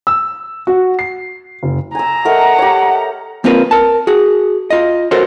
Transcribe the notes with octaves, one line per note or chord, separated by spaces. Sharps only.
E6
F#4
C7
F#1
G#5 A#5 E6
A3 A#4 D#5 F#5
G4 C#5
A#3 C4 F4 A#4 B4
A#4 A5
F#4 G#4
F4 D#5
F#4 A4 A#4 C5 C#5